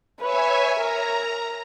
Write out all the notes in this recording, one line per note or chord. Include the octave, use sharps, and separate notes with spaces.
B4 C#5 E5 G#5
A#4 A#5